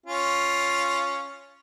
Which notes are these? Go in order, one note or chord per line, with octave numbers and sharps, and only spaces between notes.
C#4 F4